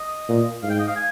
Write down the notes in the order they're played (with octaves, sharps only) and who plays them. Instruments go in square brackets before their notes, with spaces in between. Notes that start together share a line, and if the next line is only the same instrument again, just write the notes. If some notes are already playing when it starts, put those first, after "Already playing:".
Already playing: [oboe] D#5
[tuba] A#2
[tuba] G#2 [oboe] F5
[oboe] G5
D#5
F5
G#5